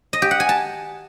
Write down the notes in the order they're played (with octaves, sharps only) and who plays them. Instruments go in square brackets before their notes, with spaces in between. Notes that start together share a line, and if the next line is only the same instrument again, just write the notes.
[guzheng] D#5
G4
F#5
G#5
A5